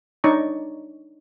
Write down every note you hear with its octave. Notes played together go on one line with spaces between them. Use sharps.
D4 D#4 C#5 D5 A#5 C#6